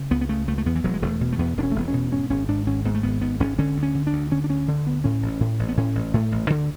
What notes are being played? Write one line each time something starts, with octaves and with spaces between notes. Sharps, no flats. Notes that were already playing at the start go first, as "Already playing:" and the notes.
Already playing: C#3
C#2 B3
B3
C#3 A3
C#2 A3
A3
E2 B3
E3
E1 F#3
G#3
E1 A3
B2
A3
E2 B3
E1 D4
C#4
A3
E1 B3
C#4
B2
G#2 C#4
G#1 C#4
G#2 D4
G#1 C#4
G#2 B3
A3
G#1 B3
G#2 B3
G#1 C#4
D3 C#4
D2
C#4
D3
D4
D2
D3 C#4
D4
D2 C#4
D3
D2 B3
A2 C#4
A1
A2
A1
B3
A2 C#4
A1
A2 A3
A1
D2 D3